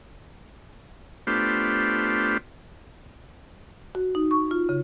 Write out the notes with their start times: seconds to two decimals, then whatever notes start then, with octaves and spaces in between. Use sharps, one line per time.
1.27 A3 B3 D4 F4 G4 C5
3.95 F#4
4.15 D#4
4.31 C#6
4.51 F4
4.69 C#3